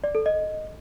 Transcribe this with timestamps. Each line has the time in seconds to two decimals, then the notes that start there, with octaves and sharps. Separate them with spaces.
0.04 D5
0.15 A4
0.26 D#5